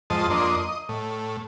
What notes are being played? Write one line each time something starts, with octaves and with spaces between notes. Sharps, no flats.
F2 G#2 C5 D#5 A5
F2 A#3 D4 D#5 C6
D#5
A2